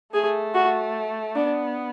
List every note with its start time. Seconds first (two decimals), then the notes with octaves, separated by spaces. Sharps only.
0.14 A3 G#4
0.54 F#4
1.36 B3 D4